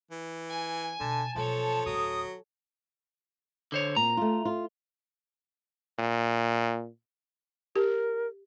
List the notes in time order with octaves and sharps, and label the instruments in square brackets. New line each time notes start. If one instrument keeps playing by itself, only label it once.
[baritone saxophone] E3
[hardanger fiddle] G#5
[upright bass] B2 [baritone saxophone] D3 [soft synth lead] A5
[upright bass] B2 F#3 [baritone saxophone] F3 [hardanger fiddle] A4 C#5
[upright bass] D1 D3 [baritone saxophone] F#3 [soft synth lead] D#6
[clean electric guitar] D3 C5 C#5
[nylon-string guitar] A#2 C4 [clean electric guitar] A#5
[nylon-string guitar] A3 F4
F4
[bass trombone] A#2
[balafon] G4 [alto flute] A#4